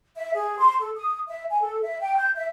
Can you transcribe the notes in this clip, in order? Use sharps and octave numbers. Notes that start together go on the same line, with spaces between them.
E5
G#4
C6
A4
D#6
E5
G#5
A4
E5
G5
G6
E5